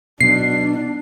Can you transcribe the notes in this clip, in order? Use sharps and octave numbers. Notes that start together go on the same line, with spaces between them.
B2 F#3 D4 C7